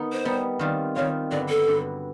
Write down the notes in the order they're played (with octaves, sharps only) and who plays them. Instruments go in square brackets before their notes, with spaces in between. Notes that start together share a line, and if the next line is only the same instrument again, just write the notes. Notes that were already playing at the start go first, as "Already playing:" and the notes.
Already playing: [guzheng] D#3 B3 D#4
[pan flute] C5
[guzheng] G3 B3 D#4
D#3 G3 C4 F4
[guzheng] D#3 G3 C4 F4 [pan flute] C#5
[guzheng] G2 D3 F#3 B3 [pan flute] D5
[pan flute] A4
[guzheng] G2 D3 F#3 B3